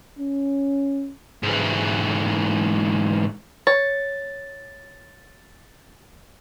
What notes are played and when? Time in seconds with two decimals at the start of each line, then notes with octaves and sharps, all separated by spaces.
0.19 C#4
1.43 G#2 E3
3.67 C#5 A6